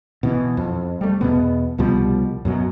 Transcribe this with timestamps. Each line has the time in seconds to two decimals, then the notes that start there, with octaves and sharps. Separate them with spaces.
0.23 B2 E3
0.57 F2
1.01 G3 A3
1.21 E2 B2 B3
1.78 C2 B2 F3 G3
2.45 F#2 B2 F#3